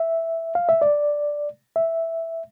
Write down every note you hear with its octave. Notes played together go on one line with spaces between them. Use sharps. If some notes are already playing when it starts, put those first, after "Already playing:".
Already playing: E5
F5
E5
D5
E5